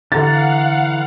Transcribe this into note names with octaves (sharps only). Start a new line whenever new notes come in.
D3 E3 F5 F#5 A#5 A6